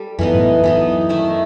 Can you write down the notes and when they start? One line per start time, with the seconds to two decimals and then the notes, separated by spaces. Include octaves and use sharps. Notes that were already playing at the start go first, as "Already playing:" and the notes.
Already playing: G3 A4
0.19 F#2 E3 B3 D#4
0.34 F#2 A2
0.49 F#2
0.64 F#2 E3 B3 D#4
1.09 D#3 A3 E4